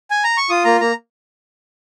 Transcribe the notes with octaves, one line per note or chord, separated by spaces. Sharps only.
G#5
A#5
C#6
F4 D#6
A#3 A#5
A#3 A#5